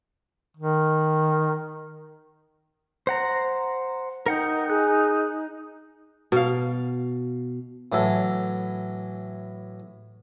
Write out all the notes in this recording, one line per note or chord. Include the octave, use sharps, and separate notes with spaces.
D#3
C5 F#5 A#5
D#4 A#4 F#5 G5
G#4 F#6
B2 F5
A2 E3 F#3 A4